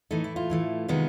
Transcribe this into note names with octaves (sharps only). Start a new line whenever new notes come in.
A2 E3 A3 D#4
E4
F4
A2 E3 A3
C3 D#3 G#3 B3